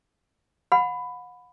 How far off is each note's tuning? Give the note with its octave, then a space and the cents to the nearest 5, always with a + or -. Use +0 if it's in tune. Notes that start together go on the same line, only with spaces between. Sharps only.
F#5 -40 B5 +10